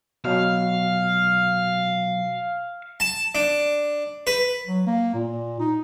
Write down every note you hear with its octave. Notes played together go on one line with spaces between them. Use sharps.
B2 F#3 F5
A5
D4
B4
F#3
A#3
A#2
D#4